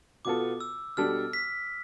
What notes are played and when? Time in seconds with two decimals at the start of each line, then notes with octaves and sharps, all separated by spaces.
0.25 B2 B3 F4 A4 D6
0.60 E6
0.97 B2 G3 D4 A4 F6
1.33 B6